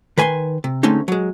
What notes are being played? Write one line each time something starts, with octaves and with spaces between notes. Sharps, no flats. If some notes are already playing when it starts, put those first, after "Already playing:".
D#3 B4 G#5 B5 C6
C3
D3 G#3 A3 C4 C#4 D#4
F#3 G#3